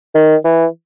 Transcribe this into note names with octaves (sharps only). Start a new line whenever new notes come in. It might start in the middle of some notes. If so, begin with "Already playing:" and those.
D#3
E3